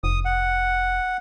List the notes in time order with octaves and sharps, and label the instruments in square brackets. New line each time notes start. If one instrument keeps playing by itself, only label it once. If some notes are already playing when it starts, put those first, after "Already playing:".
[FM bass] F1 [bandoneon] D#6
[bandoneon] F#5